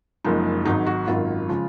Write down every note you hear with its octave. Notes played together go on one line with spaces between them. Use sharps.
F#1 F#2 F3 G#3 D#4
G#1 G#2 D#3 F#3 D#4
F#4
G#1 F#2 D#3 F#3 F4
C#3 F3 G#3